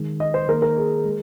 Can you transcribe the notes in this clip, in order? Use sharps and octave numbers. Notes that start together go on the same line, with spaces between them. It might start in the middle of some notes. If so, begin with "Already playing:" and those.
Already playing: D#3 G#3
D#5
C5
D#3 A#3 A#4
A#4
G#4
G#3